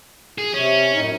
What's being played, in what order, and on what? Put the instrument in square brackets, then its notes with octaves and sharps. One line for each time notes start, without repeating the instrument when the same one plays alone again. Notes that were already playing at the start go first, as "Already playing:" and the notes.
[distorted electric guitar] G#4
[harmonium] C3 [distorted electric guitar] C#4
[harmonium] F#2 A2 D#4